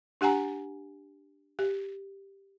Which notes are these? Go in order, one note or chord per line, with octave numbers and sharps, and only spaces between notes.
D4 G4 F#5 G#5 A#5
G4